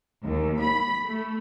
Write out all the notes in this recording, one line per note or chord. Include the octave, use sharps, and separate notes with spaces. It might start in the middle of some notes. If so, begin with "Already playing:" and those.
D#2
B5
A3